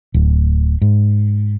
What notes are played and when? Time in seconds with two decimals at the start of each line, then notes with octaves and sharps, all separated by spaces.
0.14 D1
0.82 G#2